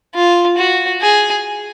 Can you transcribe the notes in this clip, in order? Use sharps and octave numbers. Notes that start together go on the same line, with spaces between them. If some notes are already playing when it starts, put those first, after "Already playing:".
F4
F#4
G#4